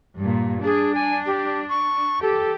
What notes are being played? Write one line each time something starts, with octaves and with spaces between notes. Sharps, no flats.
G2 A#2
D4 G#4
G#5
G4
C#6
G4 A4